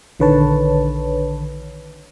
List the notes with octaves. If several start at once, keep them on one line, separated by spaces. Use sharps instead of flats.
A#1 D3 D#3 B4 C#5 A5